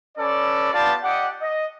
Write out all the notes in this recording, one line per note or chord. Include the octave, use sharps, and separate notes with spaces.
C#4 A4 B4 D5
B3 F4 G4 D5 A5
G4 D5 D#5 F#5
D#5